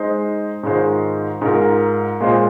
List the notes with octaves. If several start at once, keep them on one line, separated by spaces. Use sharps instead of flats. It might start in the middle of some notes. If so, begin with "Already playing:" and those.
Already playing: G#3 D#4 C5
G#2 D#3 G#3 F4 C5
G#2 G#3 F4 A#4
A#2 G#3 F4 C5